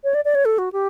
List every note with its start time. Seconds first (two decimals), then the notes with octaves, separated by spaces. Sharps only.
0.04 C#5
0.14 D5
0.25 D5
0.35 C#5
0.45 A4
0.58 F#4
0.72 G4